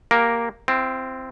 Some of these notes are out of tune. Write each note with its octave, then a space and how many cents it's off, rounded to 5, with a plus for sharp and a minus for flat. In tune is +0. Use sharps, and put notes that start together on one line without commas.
A#3 +0 G4 +0 A#4 +0
C4 -5 F4 -45